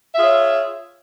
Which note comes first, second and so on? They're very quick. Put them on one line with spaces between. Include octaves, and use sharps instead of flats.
E5 F4 G#4 C#5